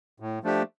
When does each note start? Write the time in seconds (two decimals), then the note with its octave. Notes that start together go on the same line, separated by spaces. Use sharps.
0.20 A2
0.43 F3 A3 D4 G4